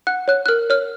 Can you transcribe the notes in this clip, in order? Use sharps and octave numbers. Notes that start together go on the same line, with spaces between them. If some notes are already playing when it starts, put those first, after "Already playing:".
F#5 F#6
C#5 F#6
F#6
A#4 F6
C#5 F6